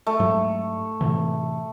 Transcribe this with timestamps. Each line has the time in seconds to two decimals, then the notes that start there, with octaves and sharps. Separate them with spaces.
0.06 A3
0.20 G#2 F#3
1.01 A2 C3 E3